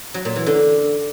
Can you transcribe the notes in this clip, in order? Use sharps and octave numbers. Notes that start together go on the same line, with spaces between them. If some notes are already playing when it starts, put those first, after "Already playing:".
F#3
A#2
E3
D3